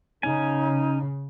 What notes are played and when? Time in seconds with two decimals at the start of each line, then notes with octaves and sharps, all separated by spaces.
0.23 C#3 C#4 D#4 G#5